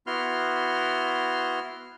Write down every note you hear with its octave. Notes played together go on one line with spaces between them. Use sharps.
B3 E4 F#4 C6 F6